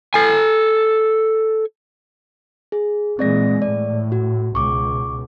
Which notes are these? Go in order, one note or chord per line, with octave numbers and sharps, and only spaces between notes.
A4 G#5
G#4
A#2 E3 G#3 C4 D5 A#6
A2 D5
F#4
C#2 B2 C#6 D6